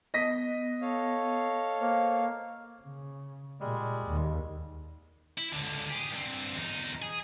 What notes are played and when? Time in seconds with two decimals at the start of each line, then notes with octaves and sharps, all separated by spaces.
0.14 B3 D#5 A#6 B6
0.82 A4 C#5 F5
1.80 A#3 C5
2.83 C#3
3.60 A#2 G3 G#3
4.07 D#2
5.38 E4
5.53 C#2 D3
5.90 G4 G#4
6.12 G2 C4
6.57 E2 D#4
7.02 G#4